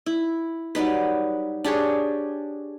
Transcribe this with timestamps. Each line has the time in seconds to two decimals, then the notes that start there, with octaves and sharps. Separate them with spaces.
0.06 E4
0.75 F#3 G3 D#4 B4
1.64 D4 G4 G#4 C#5